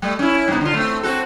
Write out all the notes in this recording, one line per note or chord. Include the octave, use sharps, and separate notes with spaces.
G3 A3
C#4 E4
G2 C3 B3
D3 F4
A3 C4
C4 F#4 A4